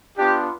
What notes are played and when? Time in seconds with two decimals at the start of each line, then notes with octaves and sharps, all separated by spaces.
0.17 B3 D4 F4 G4